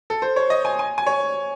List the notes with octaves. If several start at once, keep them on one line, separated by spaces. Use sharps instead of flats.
A4
C5
C#5
D#5
G#5
G#5
G#5
C#5